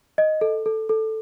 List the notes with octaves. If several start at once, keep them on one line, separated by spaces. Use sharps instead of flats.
D#5
A4
A4
A4